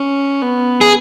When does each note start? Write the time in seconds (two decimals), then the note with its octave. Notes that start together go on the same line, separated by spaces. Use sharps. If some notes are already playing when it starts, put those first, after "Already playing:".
Already playing: C#4
0.42 B3
0.81 G#4